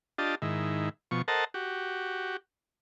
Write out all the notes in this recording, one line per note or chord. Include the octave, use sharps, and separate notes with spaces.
D4 F4 G4 D#5 A5
G#2 D#3 E4
B2 F3 C#6
A4 A#4 C5 D#5 F#5 A5
F#4 G4